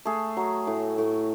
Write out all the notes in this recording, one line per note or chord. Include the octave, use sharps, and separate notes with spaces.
A3 G#4
F#3
A2
A2